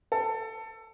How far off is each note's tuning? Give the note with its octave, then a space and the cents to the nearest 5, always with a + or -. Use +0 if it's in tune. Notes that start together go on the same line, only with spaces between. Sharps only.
A4 +20